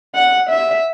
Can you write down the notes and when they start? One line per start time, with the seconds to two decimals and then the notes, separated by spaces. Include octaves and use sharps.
0.14 F#5
0.50 E5